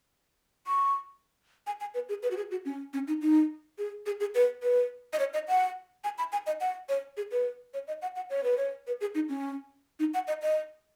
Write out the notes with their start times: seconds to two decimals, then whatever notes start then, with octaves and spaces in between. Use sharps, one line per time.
0.67 C#6
1.67 G#5
1.80 G#5
1.94 B4
2.09 G#4
2.23 B4
2.31 F#4
2.37 G#4
2.51 F#4
2.65 C#4
2.93 C#4
3.08 D#4
3.22 D#4
3.78 G#4
4.06 G#4
4.20 G#4
4.35 B4
4.63 B4
5.13 D#5
5.19 C#5
5.33 D#5
5.48 F#5
6.04 G#5
6.18 B5
6.32 G#5
6.47 D#5
6.61 F#5
6.89 C#5
7.17 G#4
7.31 B4
7.74 C#5
7.88 D#5
8.02 F#5
8.16 F#5
8.30 C#5
8.44 B4
8.57 C#5
8.87 B4
9.01 G#4
9.15 D#4
9.29 C#4
10.00 D#4
10.14 F#5
10.28 D#5
10.42 D#5